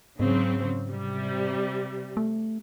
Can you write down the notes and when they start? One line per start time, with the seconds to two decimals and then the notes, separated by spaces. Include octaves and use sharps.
0.20 G#2 C#3 F#3 C4
0.90 C3 G3
2.17 A3